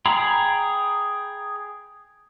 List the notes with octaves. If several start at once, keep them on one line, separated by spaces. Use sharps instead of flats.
G#4 G5 A#5 B5